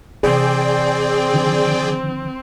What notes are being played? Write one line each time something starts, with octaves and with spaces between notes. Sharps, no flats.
C3 E3 C4 G#4 D5 G5
D3 D#3 F3